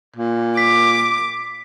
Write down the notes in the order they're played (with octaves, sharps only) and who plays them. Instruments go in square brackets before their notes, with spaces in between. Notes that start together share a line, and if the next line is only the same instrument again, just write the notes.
[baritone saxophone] A#2
[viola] D6 [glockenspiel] B6